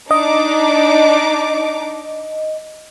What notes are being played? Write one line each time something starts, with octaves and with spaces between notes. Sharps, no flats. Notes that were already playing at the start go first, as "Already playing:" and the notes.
D4 D#4 D#5 D6